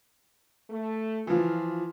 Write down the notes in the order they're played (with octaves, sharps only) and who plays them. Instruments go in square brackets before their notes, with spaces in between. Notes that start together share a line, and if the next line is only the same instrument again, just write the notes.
[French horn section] A3
[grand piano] E3 F3 [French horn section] F4